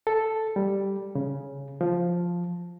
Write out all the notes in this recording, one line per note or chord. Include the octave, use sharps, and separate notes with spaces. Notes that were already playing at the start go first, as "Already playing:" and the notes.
A4
G3
C#3
F3